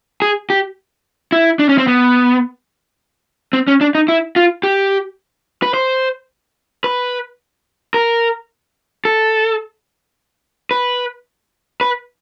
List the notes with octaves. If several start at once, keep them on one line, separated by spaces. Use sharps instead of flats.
G#4
G4
E4
D4
C#4
C4
B3
C4
C#4
D4
D#4
E4
F4
G4
B4
C5
B4
A#4
A4
B4
B4